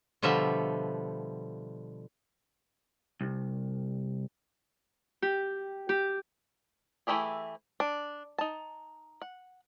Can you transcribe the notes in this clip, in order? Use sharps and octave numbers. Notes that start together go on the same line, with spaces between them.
B2 D3 F3 G3 E5
C2
G4
G4
E3 A3 E4 G4 G#4
D4
D#4 A5
F#5